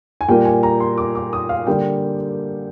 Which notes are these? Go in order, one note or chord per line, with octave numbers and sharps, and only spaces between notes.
G#5
A#2 G3 A#3 G5
G#5
A#5
C6
D6
D6
D#6
F5
D3 G3 A#3 G5